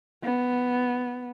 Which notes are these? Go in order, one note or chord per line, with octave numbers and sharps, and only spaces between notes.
B3